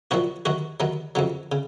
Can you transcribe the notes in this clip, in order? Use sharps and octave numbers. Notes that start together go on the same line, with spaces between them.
C2 A#2 F3 F#3 F#4
D#2 D#3 F#3 F#4
D#2 D#3 F#3
F2 C#3 F#3
C#3